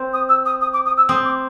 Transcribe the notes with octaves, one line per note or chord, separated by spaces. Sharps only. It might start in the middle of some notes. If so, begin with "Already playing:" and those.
Already playing: C4
D#6
E6
D#6
D#6
D6
D#6
E6
C4 D#6
D6